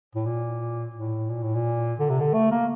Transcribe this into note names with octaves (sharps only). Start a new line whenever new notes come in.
A2
A#2
A2
A#2
A2
A#2
D3
C3
D3
A3
A#3